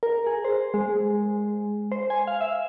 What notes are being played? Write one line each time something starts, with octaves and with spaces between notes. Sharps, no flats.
A#4
G#4
C5
G#3
C5
G#5
F5
E5